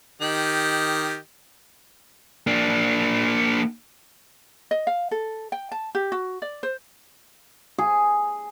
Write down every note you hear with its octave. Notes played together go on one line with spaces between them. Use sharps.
D#3 G4 D#5
A#3 D4
D#5
F5
A4
G5
A5
G4
F#4
D5
C5
G#4